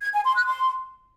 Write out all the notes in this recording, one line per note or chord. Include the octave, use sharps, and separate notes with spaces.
G#6
G#5
C6
F#6
C6